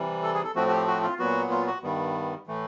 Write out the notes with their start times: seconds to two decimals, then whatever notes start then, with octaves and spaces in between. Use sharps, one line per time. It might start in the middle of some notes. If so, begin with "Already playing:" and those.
Already playing: C3 E3 G3
0.23 A4
0.34 G#4
0.44 A4
0.55 A2 F3 A3 C4 F#4
0.67 F#4
0.71 G4
0.87 F#4
1.03 F4
1.19 A#2 F#3 B3 F#4
1.51 F4
1.67 F#4
1.83 G2 D#3 G3 B3
2.47 A2 E3 A3